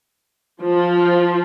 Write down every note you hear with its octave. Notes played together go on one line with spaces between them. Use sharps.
F3